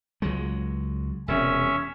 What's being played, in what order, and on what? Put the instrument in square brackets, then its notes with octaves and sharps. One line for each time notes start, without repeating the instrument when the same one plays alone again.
[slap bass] C#2 F#3 G#3
[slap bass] E1 E2 C3 [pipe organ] C#4 E5